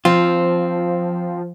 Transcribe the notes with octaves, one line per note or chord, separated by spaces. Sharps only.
F3 C4 F4